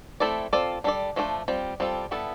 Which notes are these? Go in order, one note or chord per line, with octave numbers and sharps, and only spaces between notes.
A3 C4 E4 A4 D5
C4 F4 A4 D5
G3 D4 A4 D5
F3 A3 D4 A4 C5
G3 C4 F4
G3 C4 F4 A4
G3 B3 E4 A4